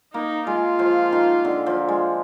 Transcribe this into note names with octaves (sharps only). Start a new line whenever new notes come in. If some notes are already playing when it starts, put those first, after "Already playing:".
A#3 D#4
G#3 F4
F3
D#3
D3
F3
G#3